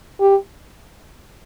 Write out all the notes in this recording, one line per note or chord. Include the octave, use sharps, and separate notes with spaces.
G4